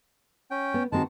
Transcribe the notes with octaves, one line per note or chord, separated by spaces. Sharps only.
C#4 G5
B3
D#3 G#3 C4 F#4 A5